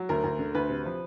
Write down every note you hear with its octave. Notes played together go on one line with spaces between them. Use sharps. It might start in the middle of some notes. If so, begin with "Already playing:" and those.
Already playing: F#3
D2 A#4
D2
D3
D2 B4
C3
F3